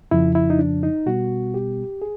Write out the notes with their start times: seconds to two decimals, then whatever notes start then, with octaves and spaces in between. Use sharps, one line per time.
0.11 F2 C#3 F3 E4
0.35 E4
0.50 D#4
0.59 D4
0.83 D#4
1.06 B2 G3 B3 F#4
1.54 G4
2.02 G#4